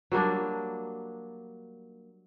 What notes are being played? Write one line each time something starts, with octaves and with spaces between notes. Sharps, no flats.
F#3 G3 A#3 D4